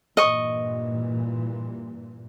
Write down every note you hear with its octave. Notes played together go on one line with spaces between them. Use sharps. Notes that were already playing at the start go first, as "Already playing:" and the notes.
G2 A#2 E3 D#5 C#6